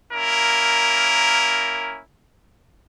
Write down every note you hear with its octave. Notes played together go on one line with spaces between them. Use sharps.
A#3 C#4 E4 A#4